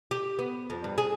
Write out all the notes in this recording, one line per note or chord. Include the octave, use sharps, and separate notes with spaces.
G4
B3
F2
G2
G#4